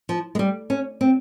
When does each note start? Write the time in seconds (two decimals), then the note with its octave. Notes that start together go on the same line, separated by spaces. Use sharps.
0.09 F3
0.35 G#3
0.39 G3
0.70 C#4
1.01 C4